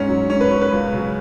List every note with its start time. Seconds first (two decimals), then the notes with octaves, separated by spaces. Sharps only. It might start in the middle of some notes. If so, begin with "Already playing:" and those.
Already playing: G#2 C#4
0.09 F#3
0.30 G#2 C#4
0.41 B4
0.50 F#3 C#5
0.61 B4
0.72 C#2
0.93 C#3 F#3